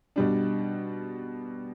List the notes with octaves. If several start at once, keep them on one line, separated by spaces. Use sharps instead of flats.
B2 G3 D4